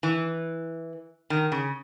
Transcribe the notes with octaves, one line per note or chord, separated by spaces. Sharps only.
E3
D#3
C#3